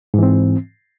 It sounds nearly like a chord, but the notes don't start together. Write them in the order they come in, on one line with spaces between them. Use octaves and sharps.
G#2 E3 C4